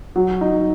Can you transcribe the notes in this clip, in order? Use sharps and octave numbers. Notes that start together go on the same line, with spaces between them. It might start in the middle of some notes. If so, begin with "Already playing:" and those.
F#3
D#4